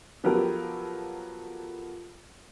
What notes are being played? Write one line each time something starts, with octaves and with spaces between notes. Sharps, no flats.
F3 F#3 B3 G4 A4 A#4